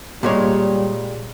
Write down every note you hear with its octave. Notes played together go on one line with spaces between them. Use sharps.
A#2 G3 G#3 C#5